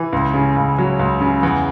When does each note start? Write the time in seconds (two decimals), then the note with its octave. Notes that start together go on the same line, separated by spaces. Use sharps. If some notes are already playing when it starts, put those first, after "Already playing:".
Already playing: E3
0.13 C#2
0.34 C#3
0.56 C#2
0.78 F#3
0.99 C#2
1.21 C#3
1.43 E2